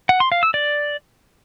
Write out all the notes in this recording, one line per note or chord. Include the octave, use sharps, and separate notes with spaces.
F#5
C6
F5
E6
D5